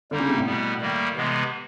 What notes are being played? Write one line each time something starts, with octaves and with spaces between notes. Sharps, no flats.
D3 G3 A#3 D#4
C#3
C3
A2
B2 G3 B3
D#3 G3 A#3
C3 E3 G#3 B3